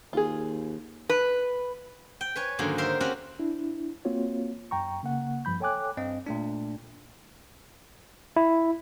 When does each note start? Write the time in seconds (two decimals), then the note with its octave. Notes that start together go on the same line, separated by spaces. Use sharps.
0.13 D#2 F4 G#4
1.09 B4
2.21 G5
2.36 B4 C#5 G#5
2.59 G#2 D3 D#3 F#3 A#3 C#4
2.78 A#4 C5 E5 F5 G5
3.01 C4 C#4 F#4 G4 F5 F#5
3.39 D4 E4
4.05 A#3 C4 F4 F#4 C#5
4.71 F#2 G5 A#5 C#6
5.03 C#3 A#3 F#5
5.45 G2 F3 B5 G6
5.60 A4 C#5 G5 G#5 D6 F#6
5.97 G2 C4 D#5
6.26 A#2 A3 D4
8.36 E4